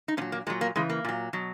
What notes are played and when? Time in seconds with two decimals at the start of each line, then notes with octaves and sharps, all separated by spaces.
0.08 D#4
0.17 A#2 C#4
0.22 F#3
0.32 A#3
0.47 A#2 F#3 G#3
0.61 A#3
0.76 C#3 E3 G#3
0.90 A#3
1.05 A#2 F#3
1.33 B2 F#3